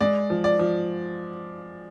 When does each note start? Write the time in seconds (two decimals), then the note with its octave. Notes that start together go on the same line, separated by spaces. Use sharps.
0.01 G#3 D5
0.30 F3
0.44 D5
0.59 F3